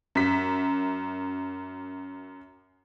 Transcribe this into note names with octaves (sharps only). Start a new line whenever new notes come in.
F#2 B6